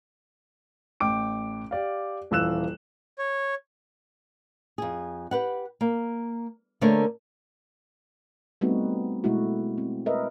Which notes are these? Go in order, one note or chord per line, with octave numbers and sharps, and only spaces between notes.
A1 G5 D6 D7
G4 D5 F5
D#1 E3 F4 E6 F#6 E7
C#5
F2 G#4
G4 B4 F#5
A#3
D3 A3 A#3 A#4 C5 C#5
G3 A3 B3 C4 D#4 F#4
B2 G#3 A3 E4 F#4
C4
A#4 B4 D#5 E5